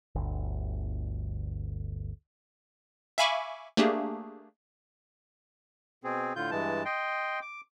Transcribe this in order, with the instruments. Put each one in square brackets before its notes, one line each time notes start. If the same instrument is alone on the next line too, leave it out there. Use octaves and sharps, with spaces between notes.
[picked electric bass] G1 D2
[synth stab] E5 F5 G#5 B5 C#6 D6
A3 A#3 D4 G4 G#4
[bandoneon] B2 C4 G#4
A2 D3 F4 G6
G2 E3 G#3 A5
D#5 G5 C6
D6